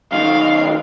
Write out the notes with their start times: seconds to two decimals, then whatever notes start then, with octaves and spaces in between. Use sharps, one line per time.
0.12 B1 D#3 F5